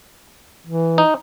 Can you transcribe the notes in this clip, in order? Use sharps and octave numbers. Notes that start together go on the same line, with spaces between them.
E3
D#4